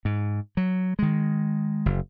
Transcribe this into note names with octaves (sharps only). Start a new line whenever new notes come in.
G#2
F#3
D#3 G#3
F#1